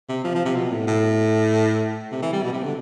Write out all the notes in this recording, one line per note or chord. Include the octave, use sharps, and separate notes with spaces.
C3
F3
F3
C3
B2
A2
A2
C3
E3
G3
B2
C3
D3